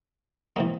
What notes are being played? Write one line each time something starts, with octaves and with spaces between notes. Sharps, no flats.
C3 E3 G#3 A#3